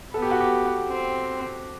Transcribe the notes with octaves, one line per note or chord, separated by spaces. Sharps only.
B3 A4
G4
F#4
G4
C4